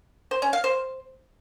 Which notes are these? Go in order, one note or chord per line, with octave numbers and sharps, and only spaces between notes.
C5
C#4
F5
C5